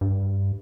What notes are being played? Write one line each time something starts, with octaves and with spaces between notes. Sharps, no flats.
G2